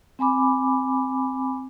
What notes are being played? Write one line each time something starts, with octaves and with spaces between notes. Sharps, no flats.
C4 G#5 B5 D6